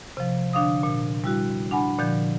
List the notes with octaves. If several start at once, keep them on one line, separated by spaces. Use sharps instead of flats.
C3 F3
D3 D4 F5 D#6
A#2
G3 E4 F#4
D4 F#5 G#5 B5
A#2 D3 F3 G6